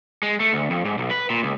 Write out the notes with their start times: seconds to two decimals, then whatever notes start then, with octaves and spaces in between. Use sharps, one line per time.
0.23 G#3
0.40 A3
0.53 D2
0.70 F2
0.85 G#2
0.98 B1
1.11 B4
1.30 A#2
1.43 C#2